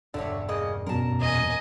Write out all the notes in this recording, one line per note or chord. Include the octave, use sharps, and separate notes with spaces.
E1 G2 D3 A3 D4 C#5
C#3 A#3 D#5
F#2 B2 A#4 A5
E2 A#2 D#5 G#5